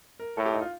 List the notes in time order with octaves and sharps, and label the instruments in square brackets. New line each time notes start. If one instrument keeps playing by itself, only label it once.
[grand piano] A#4
[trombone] A2 [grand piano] A4
[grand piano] G4
D#4
F4